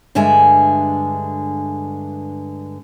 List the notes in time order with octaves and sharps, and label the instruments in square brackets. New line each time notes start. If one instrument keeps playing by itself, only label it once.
[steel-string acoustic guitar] G2 D3 G#3 E5 G#5